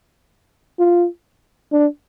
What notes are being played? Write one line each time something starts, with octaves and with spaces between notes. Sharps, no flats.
F4
D4